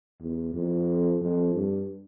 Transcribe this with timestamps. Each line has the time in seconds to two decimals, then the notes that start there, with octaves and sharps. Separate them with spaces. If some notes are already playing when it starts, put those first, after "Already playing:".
0.22 E2
0.54 F2
1.21 F2
1.53 G2